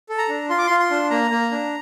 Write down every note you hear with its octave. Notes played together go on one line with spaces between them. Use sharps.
A4
A#5
D4
F4 C6
D6
F4 C6
C6
D4
A#3 A#5
A#3
D4